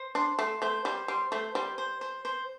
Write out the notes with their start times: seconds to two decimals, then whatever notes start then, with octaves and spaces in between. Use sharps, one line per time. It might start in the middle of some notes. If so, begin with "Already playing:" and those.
Already playing: C5
0.15 D4 C6
0.39 A3 C6
0.62 A3 C5
0.85 G3 C5
1.08 G3 C6
1.32 A3 C5
1.55 G3 C5
1.78 C5
2.01 C5
2.25 C5